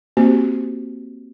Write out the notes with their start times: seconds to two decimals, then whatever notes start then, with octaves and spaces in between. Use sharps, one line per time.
0.17 A#3 C4 F#4 G4 C5